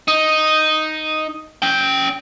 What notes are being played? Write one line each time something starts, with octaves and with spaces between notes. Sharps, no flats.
D#4
C#4 G5